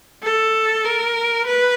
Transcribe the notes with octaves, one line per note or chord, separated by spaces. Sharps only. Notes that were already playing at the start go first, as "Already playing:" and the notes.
A4
A#4
B4